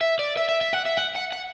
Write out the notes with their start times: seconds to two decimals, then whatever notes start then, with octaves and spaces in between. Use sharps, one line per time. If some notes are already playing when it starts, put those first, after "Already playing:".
0.01 E5
0.19 D5
0.37 E5
0.49 E5
0.61 E5
0.73 F#5
0.86 E5
0.97 F#5
1.15 F#5
1.32 F#5